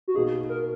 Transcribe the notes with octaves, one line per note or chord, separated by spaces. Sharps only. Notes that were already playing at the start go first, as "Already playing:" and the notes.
F#4
B2 A#3 D#4 G#4
A#4